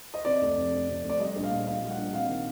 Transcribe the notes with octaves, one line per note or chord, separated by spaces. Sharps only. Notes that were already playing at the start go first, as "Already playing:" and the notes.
D#5
C3 D5
F1
F2
F1
C3
F1
D5
G3 D#5
A#1
F5
A#2
A#1 F5
G3
F#5
A#1
C3 F5
D#3